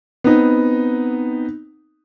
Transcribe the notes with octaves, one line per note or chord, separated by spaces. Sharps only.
B3 C4 D#4